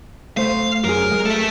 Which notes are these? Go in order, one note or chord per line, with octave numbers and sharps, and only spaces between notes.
A3 C5 F5
F#2 G#4 A#4
G#3
A3 A4 E5